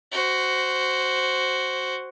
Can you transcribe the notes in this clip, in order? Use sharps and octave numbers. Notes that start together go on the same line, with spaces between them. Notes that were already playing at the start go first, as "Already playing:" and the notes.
F#4 C5